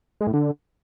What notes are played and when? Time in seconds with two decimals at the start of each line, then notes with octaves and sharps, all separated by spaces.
0.21 G#3
0.27 A2
0.34 D3